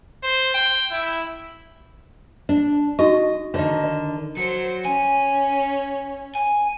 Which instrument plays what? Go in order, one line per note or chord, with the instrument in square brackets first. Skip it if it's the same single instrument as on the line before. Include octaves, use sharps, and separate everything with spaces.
[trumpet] C5
G5
E4
[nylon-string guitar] D4
[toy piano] D#4 F#4 C#6 [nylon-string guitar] D#5
[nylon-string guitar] D3 D#3 [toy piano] C#5 D5
[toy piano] D5
[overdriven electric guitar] F#3 [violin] C5 C#7
[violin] C#4 [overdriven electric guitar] G#5
[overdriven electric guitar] G#5